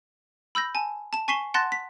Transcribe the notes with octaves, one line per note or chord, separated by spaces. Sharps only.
B5 E6 G6 A#6
G#5 A5
A5 E7
G#5 C#6 B6 C7 E7 G7
F#5 A5 C6 F#6 A6 A#6
B6